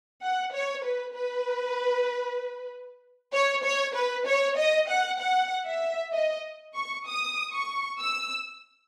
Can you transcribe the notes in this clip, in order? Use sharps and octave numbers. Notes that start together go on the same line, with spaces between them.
F#5
C#5
B4
B4
C#5
C#5
B4
C#5
D#5
F#5
F#5
E5
D#5
C#6
D#6
C#6
E6